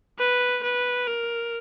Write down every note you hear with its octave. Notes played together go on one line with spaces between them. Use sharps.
B4
B4
A#4